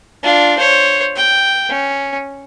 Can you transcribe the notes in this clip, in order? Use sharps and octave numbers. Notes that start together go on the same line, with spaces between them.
D4 F4
C5 C#5
G5
C#4